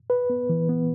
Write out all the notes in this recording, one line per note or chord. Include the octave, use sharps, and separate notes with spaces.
B4
B3
E3
B3